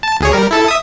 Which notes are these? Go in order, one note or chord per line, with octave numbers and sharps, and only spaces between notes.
A5
D2 G#4 C#5
G3 A#4
E4 A4 A5
E5 D#6